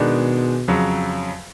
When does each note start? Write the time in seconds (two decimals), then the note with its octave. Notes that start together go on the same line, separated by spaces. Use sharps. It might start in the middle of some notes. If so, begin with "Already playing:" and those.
Already playing: B2 D#3 G#3 B3 D4
0.68 F2 C#3 F#3